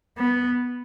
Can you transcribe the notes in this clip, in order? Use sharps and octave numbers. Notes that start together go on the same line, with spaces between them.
B3